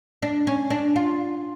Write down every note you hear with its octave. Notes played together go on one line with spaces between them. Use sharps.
D4
C#4
D4
F4